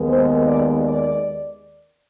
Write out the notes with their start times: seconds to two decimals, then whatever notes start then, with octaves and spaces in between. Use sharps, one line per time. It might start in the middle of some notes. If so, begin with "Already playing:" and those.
Already playing: D#2 D#3 G#3 B3
0.08 C5
0.46 D5
0.85 D5